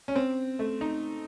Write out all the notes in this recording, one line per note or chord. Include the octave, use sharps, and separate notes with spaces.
C#4
C4
A3
D#4